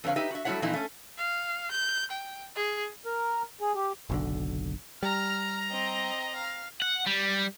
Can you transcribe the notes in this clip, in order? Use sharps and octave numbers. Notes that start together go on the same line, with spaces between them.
F2 D3 B4 C#5 F5
D#4 G4 B4 E5
F#4 E5
F#3 G3 A3 E4 C#5 F#5
A#2 E3 F3 C4 D#4 E4
A3 C#4
F5
G6
G5
G#4
A#4
G#4
G4
F#1 B1 D3
G3 A#5 F6
C4 D#5
F5
F#5
G3